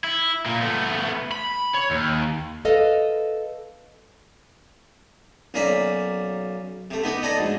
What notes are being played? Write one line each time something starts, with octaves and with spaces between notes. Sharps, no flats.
E4
A#2 A#3
A3 B3
B5
C#5
D#2
A4 B4 D#5 F5
B1 A#3 C#4 D5 E5
C3 A3
B3 D#4 G4 B4
D#4 A4 D5 G#5 A#5
D2 G#2